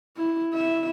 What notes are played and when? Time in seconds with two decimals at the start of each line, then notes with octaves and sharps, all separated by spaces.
0.17 E4
0.54 E4 E5